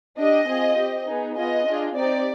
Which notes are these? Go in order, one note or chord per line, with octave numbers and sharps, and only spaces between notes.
D4 G4 D#5
C4 F4 G#4
C4 G4
B3 D#4 G#4
B3 F4 G#4 D#5
D4 F4 G#4
C4 D#4 G4 D5